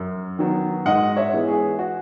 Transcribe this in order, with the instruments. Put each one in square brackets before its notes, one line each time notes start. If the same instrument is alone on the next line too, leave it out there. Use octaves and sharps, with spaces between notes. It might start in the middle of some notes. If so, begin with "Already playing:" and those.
Already playing: [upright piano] F#2
D#3 F#3 B3
G#2 D#5 F#5
C#5 E5
E3 G#3 B3
G#4
F#4